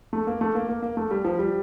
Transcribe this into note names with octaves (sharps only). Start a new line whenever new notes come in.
A3
A#3
A3
A#3
A#3
A#3
A3
G3
F3
G3